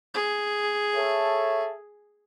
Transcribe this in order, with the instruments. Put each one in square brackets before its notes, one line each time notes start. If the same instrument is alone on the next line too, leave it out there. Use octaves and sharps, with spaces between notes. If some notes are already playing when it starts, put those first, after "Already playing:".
[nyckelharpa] G#4
[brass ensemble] A4 C#5 E5